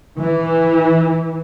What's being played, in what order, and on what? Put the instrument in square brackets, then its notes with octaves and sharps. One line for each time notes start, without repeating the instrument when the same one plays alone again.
[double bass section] E3